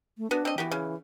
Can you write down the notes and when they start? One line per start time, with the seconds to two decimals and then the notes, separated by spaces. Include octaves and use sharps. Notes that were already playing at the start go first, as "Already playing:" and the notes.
0.18 A3
0.31 B3 D4 F#4
0.45 C4 D#5
0.58 E3 B3 F#4 G4
0.71 C#3